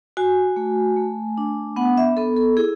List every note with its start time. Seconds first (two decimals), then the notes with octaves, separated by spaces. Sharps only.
0.17 F#4 G#5
0.56 A3
0.97 A3
1.38 D4
1.76 B3 F#5
1.98 E5
2.17 B3 A4
2.37 A4
2.57 E4 G#4